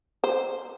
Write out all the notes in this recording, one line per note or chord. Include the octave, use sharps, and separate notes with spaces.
C5